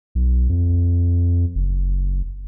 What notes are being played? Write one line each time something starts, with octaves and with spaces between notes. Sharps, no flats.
B1
F2
F#1